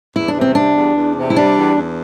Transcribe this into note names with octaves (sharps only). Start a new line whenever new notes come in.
E2 E4
D4
C3
C4
G3 D4
E2
E2
C3
E4
G3 D4
E2
E2